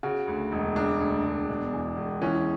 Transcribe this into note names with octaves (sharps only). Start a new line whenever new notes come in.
C#3 F#4
D2
E1
C#3 D4
D2
E1
B2
E2
E1
E3 C#4